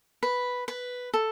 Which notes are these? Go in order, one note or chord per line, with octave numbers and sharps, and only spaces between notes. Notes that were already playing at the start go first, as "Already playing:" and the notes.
B4
B4
A4